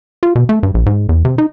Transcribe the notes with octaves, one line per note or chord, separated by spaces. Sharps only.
F4
B2
A3
G2
A#1
G#2
E2
C3
D#4